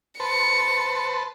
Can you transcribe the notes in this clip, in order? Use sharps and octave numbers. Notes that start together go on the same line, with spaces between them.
B4 C5 A5 C#7